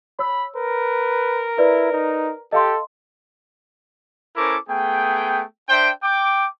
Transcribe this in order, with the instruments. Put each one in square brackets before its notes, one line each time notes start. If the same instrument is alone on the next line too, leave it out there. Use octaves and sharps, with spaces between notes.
[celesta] C#5 E6 [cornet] B5
[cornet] A#4 [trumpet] B4
[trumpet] E4 [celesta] B4 D5
[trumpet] D#4
[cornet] G4 [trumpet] A4 [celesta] D#5 F5 C6
[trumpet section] C#4 E4 A4 A#4 C5 D6
A3 B3 G#4 G5
D4 C5 E5 G5
G5 D6